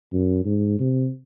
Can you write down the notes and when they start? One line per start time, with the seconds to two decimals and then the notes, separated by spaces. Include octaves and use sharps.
0.13 F#2
0.45 G#2
0.79 C3